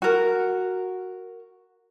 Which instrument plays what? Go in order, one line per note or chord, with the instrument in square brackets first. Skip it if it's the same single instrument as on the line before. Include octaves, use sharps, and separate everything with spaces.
[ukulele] F#4 A#4